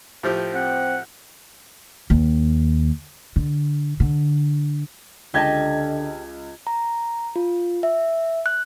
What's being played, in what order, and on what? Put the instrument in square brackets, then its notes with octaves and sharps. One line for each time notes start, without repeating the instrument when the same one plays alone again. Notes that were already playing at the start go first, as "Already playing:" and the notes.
[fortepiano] A2 F3 G4
[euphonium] C4 [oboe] F#5
[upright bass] D#2
D3
D3
[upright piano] C#2 G#6 [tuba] D3 [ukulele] G4 D#5 A5
[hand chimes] A#5
F4
E5
F#6